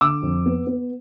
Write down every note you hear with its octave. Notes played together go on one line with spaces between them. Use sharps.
D3 D6 E6
F2
B3
B3